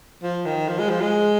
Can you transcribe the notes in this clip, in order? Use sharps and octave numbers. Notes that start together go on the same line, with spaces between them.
F3
D#3
F3
G#3
F3
G#3